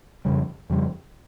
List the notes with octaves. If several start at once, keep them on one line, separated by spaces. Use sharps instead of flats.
F2 C#3 G3
F2 C#3 G3